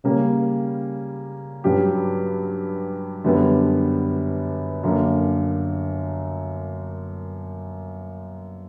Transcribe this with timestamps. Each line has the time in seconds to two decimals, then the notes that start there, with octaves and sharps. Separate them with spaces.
0.04 C#3 G3 A#3 C#4
1.64 G2 F#3 C#4 G4
3.24 F#2 D3 G3 B3
4.83 F#2 D3 A#3